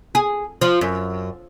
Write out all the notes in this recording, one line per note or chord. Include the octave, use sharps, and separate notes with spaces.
G#4
F3
F#2